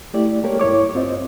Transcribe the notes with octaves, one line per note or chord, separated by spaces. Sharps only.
A3 E4 G4 D5
G#3 A#3 G4 A4 A#4 C#5
G2 E4 C#5 D6
C4 F4 C5 D#5